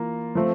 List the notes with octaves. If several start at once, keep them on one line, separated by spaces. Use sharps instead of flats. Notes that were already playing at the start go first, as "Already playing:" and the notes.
Already playing: E3 A#3 F4 A#4
F3 A3 C4